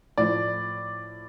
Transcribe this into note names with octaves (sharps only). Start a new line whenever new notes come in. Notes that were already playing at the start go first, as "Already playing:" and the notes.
A2 F3 D5